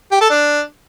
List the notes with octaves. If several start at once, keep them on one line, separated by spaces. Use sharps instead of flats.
G4
A4
D4